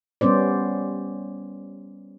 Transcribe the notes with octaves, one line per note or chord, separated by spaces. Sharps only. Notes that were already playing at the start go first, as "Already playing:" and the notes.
G3 B3 C#4 C5 D5